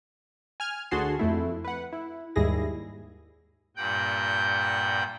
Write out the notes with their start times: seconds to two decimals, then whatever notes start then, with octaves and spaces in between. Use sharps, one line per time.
0.60 G#5 F6 G#6
0.91 D2 D3 F#4 G#4 A5 C6
1.19 F2 A3 E4
1.64 B4 F#5
1.92 E4
2.36 D#2 G#2 G3 E4 G#4 A#6
3.77 G2 A#2 F#5 G5 G6